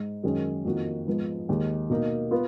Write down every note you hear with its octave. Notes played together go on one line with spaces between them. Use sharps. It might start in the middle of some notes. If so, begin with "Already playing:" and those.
Already playing: G#2
F#2 D#3 G#3 C#4
F2 D#3 A#3 D#4 F#4
G#2 F3 B3
D#2 D#3 G#3 D#4
B2 A#3 D#4
B3 F4